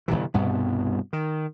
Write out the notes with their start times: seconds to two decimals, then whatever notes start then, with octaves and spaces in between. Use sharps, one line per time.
0.08 G1 C#2 C3 E3
0.34 C2 G2 B2 B3
1.13 D#3